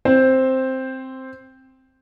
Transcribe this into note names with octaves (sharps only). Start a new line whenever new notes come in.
C4 C5